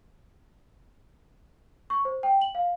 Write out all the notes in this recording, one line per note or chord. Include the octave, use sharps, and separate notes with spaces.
C#6
C5
G5
F#7
F5